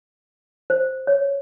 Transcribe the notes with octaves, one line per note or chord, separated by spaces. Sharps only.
C5
C#5